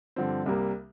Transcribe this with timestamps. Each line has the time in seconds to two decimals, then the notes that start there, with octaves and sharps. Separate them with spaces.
0.16 G2 D3 F3 C4
0.46 C2 C3 G3 A#3